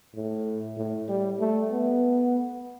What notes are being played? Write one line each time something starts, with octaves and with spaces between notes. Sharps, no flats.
A2
A2
G3
A3
B3